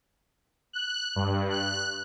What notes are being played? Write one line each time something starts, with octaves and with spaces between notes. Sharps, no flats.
F#6
G2
F#6